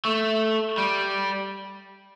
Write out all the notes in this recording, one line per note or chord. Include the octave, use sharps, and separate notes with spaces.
A3
G3